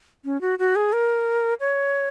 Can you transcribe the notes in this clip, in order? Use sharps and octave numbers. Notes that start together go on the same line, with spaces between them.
C#4
F#4
F#4
G#4
A#4
C#5